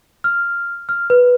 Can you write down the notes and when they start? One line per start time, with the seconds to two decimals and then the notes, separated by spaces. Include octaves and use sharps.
0.24 F6
0.89 F6
1.10 B4